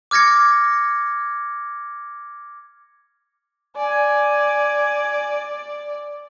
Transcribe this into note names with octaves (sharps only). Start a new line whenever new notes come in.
D6 F6 G#6 A#6 C#7
D5 G#5